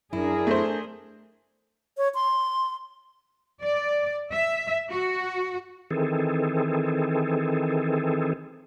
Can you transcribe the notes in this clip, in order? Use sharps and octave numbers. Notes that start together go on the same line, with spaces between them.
F#2 D4 E4 G#4 A#4
A3 C5
C#5
C6
D5
E5
F#4
D#3 E3 C4 G#4 A4